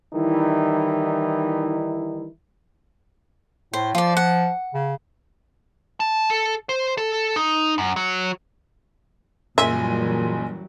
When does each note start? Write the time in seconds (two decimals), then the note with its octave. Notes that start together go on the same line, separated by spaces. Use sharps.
0.14 D#3 E3 G3 D#4 E4
3.73 A2 C5
3.95 F3 F4 D5
4.17 F#5
4.74 C#3
6.00 A5
6.30 A4
6.69 C5
6.97 A4
7.36 D#4
7.78 F#2
7.96 F#3
9.58 F#1 A#2 E3 F#3 G3 E5 G#5 C6